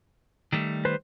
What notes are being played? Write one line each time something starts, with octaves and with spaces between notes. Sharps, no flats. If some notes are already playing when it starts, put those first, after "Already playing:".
D#3 G3 A3
B4 C5